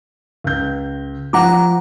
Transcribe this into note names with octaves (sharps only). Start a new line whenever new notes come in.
C#2 G6
F3 F#5 A#5 D6